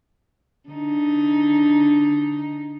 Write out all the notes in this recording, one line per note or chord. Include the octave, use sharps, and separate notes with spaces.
D3 D#4